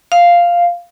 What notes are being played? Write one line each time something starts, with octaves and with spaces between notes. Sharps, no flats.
F5